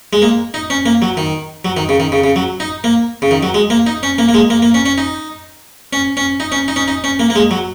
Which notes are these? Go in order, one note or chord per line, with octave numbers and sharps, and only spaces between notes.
G#3
A#3
D#4
C#4
A#3
F#3
D#3
F#3
D#3
C#3
D#3
C#3
C#3
F#3
D#4
A#3
C#3
D#3
F#3
G#3
A#3
D#4
C#4
A#3
A#3
G#3
A#3
A#3
C#4
C#4
D#4
C#4
C#4
D#4
C#4
D#4
C#4
D#4
C#4
A#3
A#3
G#3
F#3